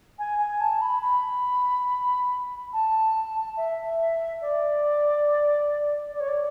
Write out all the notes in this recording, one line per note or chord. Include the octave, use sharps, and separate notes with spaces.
G#5
G#5
A5
B5
B5
A5
E5
D5
D5
C#5
D5